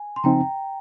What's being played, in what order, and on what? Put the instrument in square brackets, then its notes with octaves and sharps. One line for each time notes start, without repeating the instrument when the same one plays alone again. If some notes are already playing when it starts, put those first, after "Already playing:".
Already playing: [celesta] G#5
C6
[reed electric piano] C#3 F3 C4 D#4 [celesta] G5 A#5